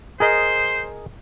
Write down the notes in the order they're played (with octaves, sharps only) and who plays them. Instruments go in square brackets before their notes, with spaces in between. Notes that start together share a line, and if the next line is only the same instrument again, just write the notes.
[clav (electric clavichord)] G#4 A#4 D#5 [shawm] C5